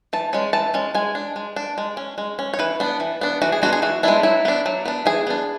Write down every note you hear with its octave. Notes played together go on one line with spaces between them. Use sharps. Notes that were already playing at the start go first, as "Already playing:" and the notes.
E3 A5
G#3 C#4
E3 A5
G#3 C#4
G#3 G#5
D4
G#3
D4
G#3
C#4
G#3
C#4
C#5
E3 B4
B3 D4
E3
B3 D4
E3 F#4
G#4
G#3 B3 D4 F#4
G#4
E3 F#4
G#3 B3 D4 E4
F#3 E4
B3 D4
F#3
B3 D4
E3 G#4
B3 D4